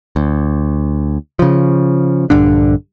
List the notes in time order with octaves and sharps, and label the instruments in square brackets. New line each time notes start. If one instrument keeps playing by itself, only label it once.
[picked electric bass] D2
C#3 F3
A#1 G2 D3 D4